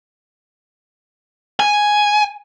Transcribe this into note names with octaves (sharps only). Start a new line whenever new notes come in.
G#5